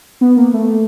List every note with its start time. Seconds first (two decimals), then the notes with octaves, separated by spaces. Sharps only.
0.21 B3
0.37 A#3
0.54 A3